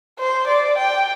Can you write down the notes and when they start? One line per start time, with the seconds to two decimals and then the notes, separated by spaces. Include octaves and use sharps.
0.19 C5
0.48 D5
0.78 G5